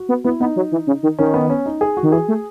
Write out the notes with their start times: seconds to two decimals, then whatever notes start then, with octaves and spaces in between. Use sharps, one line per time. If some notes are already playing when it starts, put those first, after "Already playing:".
Already playing: F#4
0.09 B3
0.24 B3 E4
0.40 B3 D#4
0.56 F#3
0.72 E3
0.87 C#3
1.03 D#3
1.19 D#3 C#4
1.34 B3
1.50 C#4
1.66 D#4
1.81 G#4
1.97 F#4
2.03 D#3
2.12 E3 G#4
2.28 A3